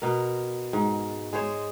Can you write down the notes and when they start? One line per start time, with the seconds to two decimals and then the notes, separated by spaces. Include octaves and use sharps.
0.02 B2 A#4
0.73 G#2
1.33 G#3 G#4 C5 C#5